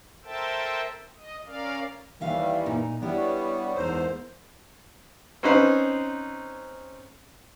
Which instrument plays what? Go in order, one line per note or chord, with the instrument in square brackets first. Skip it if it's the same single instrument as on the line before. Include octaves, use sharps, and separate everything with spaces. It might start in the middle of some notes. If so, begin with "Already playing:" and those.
[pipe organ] A4 A#4 C5 E5 G5 A5
D#5
C#4 A#4 D5 F5
[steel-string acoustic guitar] D#2 E5 F5 [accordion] D#3 E3 G3
[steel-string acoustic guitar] A#2 D#4
[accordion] G3 B3 [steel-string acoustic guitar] D4 E4 G4
[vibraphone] C#5 C#6
[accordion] E2 G#2 C5 [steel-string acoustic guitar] A4 A#4
[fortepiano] C4 C#4 D#4 B4 C5